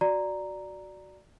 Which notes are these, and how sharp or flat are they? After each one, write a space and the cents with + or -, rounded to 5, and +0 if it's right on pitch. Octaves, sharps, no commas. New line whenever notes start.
F#4 +0 D5 +0 A#5 +0